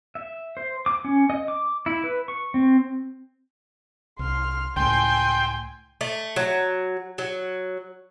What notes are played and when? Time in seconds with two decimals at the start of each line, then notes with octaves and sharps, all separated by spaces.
0.15 E5
0.57 C5
0.86 D6
1.05 C#4
1.30 D#5
1.48 D6
1.86 E4
2.04 B4
2.28 C#6
2.54 C4
4.19 C2 C6 F6
4.76 C#2 A2 G5 G#5 C6
6.01 A3
6.36 F#3
7.18 F#3